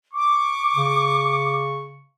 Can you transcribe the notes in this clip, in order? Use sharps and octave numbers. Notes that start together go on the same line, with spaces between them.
C#6 D6
C#3